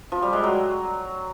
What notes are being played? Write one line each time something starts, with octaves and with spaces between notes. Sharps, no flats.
F3
G3
G#3
F#3